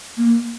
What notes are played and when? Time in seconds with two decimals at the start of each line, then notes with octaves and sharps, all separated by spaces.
0.17 A#3